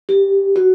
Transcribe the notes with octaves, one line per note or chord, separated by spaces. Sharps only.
G4
F#4